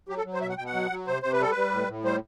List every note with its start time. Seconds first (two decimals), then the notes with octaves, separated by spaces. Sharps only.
0.09 F#3 G4
0.17 A4
0.25 F#3
0.34 C5
0.42 B2 E5
0.49 F#5
0.58 B2 G5
0.66 F#5
0.74 F#3
0.91 F#3
1.07 C3 C5
1.23 C3 C5
1.32 B4
1.40 G3 A4
1.51 G3 B4
1.72 A2
1.88 A2
2.04 G3 C5